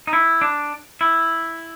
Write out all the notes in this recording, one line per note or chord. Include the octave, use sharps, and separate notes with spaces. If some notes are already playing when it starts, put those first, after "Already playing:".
D#4
E4
D4
E4